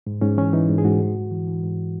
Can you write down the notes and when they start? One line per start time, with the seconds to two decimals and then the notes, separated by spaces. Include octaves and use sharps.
0.07 G#2
0.21 G#2 C#4
0.37 E3 C#4
0.53 E3 D#4
0.69 G#2
0.78 G#4
0.85 G#2 F#4
1.00 G#2
1.15 G#2
1.31 E3
1.47 E3
1.63 G#2